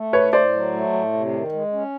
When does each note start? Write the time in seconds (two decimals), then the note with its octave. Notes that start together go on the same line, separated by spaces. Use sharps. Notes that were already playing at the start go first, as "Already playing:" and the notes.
Already playing: A3
0.13 A2 B4 C#5
0.33 A2 C5 D5
0.53 F#3
0.73 A3
0.93 A2
1.13 C3
1.32 D#3
1.52 G#3
1.72 C#4